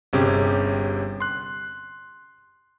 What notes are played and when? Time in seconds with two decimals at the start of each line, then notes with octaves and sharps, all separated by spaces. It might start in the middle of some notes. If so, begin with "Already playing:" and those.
0.13 G1 C3 C#4 G4 G#4
1.20 C6 F#6